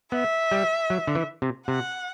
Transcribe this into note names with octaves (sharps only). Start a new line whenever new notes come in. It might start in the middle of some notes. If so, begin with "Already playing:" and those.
B3 E5
G3
F#3
D3
E3
C3
C3 F#5